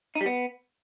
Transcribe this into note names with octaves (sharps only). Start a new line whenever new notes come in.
D#4
G3
B3